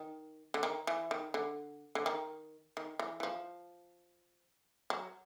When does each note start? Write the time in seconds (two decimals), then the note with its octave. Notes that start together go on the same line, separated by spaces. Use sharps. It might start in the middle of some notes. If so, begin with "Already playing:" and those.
Already playing: D#3
0.54 D3
0.63 D#3
0.87 E3
1.11 D#3
1.34 D3
1.95 D3
2.06 D#3
2.77 D#3
2.99 E3
3.20 E3
3.23 F3
4.90 F#3